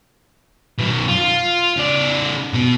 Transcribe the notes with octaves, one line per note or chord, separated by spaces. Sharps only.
F#2 B2
F4
C#3 D5
B2 B3